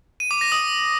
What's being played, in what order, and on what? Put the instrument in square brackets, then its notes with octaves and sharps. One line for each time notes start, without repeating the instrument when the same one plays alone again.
[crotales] D#7
D6
A#6
D#6